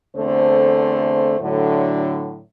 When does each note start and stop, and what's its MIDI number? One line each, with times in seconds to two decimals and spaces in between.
0.16 1.37 40
0.16 1.37 50
0.16 1.37 57
0.16 1.37 60
0.16 1.37 72
1.41 2.40 45
1.41 2.40 50
1.41 2.40 54